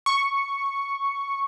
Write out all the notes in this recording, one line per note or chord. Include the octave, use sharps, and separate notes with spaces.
C#6